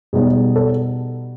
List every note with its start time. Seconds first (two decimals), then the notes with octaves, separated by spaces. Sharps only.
0.13 B2 G3 B3 D#4 G#4
0.56 A4